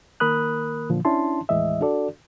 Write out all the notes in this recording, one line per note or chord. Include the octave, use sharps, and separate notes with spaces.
D#3 A#3 A#4 B5 D#6 F#6
A#2 D3 E3 F3
C#4 D4 E4 A5 C6
D#2 A2 E3 G#3 D#5 E5
D4 F#4 A4 D5